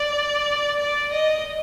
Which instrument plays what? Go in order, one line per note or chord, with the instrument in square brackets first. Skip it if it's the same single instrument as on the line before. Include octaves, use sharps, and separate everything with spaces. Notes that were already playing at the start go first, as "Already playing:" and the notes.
Already playing: [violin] D5
D5
D#5